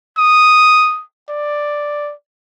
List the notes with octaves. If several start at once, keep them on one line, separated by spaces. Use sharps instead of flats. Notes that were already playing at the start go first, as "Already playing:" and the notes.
D#6
D5